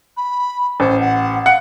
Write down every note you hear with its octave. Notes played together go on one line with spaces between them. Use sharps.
B5
A1 C5
F#5
F5 F#5